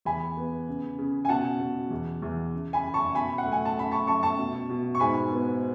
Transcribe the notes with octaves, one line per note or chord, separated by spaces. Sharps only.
E2 G#5 B5
B3
C#3
C#3
G#5
B2 F#5 A5
B2
E2
E2
C#3
G#5 B5
C#3
A5 C#6
B2 G#5 B5
F#5
A3
G#5
A5
F#2 B5
A5 C#6
F#2 A5 C#6
A5 C#6
B2
B2
C#6
G#2 G#5 B5
B3